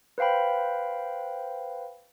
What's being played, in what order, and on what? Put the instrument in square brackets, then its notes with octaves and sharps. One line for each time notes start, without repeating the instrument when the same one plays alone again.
[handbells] B4 C5 F5 G5 B5